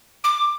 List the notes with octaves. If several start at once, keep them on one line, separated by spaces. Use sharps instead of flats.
D6